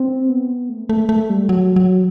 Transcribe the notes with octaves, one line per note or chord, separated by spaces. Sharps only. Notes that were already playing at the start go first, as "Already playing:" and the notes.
Already playing: C4
B3
A3
A3
A3
G3
F#3
F#3